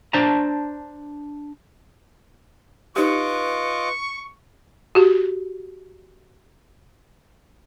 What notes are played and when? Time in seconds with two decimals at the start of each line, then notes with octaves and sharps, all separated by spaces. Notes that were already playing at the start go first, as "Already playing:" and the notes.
0.13 D4 C5 D5 A5 A#5
2.96 D#4 F4 G4 B4 D#5 C#6 D6
4.95 F#4 G4